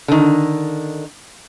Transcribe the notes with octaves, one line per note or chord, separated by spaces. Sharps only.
D3 D#3